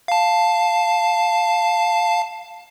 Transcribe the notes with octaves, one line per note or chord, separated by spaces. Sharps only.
F5 A5